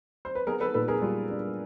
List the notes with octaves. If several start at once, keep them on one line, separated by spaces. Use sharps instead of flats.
C5
B4
B3 G#4 A#4
A4 B4
A#2 A4 B4
G#4 A#4
G3 F4
D4